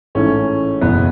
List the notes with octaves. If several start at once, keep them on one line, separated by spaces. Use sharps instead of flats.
A1 G#2 E3 A3 C#4
F#1 E2 B2 B3